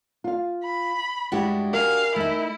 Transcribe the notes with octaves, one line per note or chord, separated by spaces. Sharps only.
F4 F5
B5
G2 G#3 D4 E4 F#4 G4
A#4 F5 G#5
A3 D#4 E4